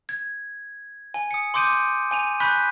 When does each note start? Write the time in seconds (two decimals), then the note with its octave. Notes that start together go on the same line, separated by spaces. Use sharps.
0.09 G#6
1.14 G#5
1.31 D#6 C#7
1.54 C6 D6 D#6 G6 D7 D#7
2.11 G#5 D#7 F7
2.40 G#5 B5 C#6 F#6 G6 B6